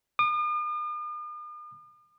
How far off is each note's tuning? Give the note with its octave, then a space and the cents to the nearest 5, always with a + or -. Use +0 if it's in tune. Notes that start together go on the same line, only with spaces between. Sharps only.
D#6 -45